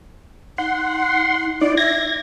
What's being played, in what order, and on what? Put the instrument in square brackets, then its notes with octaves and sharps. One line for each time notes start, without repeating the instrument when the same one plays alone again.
[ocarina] D#4 [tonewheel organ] F#5 C6
[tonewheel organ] D#4 D5 [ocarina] E4
[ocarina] E5 [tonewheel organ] G#6 A#6